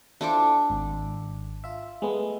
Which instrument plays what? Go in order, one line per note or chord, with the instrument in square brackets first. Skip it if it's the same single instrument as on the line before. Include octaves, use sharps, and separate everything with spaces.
[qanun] D4 A4 D6 [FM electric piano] E4 F4 C5
[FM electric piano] G#1
F4 E5
G#3 A3 B3